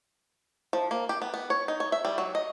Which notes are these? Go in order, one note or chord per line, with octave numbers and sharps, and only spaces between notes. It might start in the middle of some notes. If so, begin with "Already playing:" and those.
F3
A#3
G4
B3
B3
C#5
D#4
C#5
E5
G3
F#3
D#5